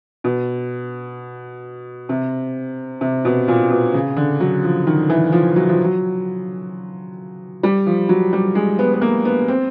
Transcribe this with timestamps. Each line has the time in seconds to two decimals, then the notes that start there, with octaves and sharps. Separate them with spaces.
0.24 B2
2.09 C3
3.01 C3
3.25 B2
3.48 A#2
3.70 B2
3.94 C#3
4.16 D3
4.40 F#3
4.64 F3
4.87 D#3
5.09 E3
5.32 F3
5.56 F#3
5.69 F3
5.84 F#3
7.63 G3
7.86 F3
8.09 F#3
8.33 G3
8.55 G#3
8.79 B3
8.94 B3
9.01 A#3
9.25 B3
9.48 C4